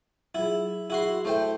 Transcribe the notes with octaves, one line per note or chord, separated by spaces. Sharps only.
F#3 E4 F4 G#4
E4 F#4 G#4 C6
A3 E4 A4 C5 E5 G5